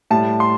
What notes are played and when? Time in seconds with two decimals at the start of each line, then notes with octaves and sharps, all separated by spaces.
0.11 A2 G3 A5
0.40 C6